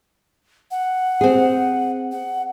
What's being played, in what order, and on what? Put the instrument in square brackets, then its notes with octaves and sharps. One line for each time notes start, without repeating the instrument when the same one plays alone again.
[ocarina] F#5
[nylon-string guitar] C4 G#4
[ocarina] F#5